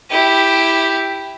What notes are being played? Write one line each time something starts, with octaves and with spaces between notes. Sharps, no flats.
E4 G4